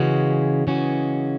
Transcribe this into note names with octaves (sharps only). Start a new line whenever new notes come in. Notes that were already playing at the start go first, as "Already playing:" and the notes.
Already playing: C#3 E3 G#3 C#4 F#4
C#3 E3 G#3 C#4 F#4